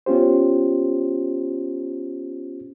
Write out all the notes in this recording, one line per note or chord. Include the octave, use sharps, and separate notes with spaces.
B3 C#4 F4 G4 C5